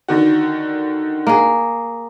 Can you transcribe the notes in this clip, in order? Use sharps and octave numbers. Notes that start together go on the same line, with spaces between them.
D3 D#3 F#4
A#3 G#4